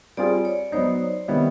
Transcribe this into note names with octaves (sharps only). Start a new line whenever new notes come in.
G3 C4 F4 G#4 D5
C#5
F#3 B3 D#4 C5
C3 D#3 G3 B3 E4